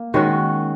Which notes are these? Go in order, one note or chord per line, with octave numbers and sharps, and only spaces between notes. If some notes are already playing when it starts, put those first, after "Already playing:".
Already playing: A#3
D#3 G#3 C#4 F#4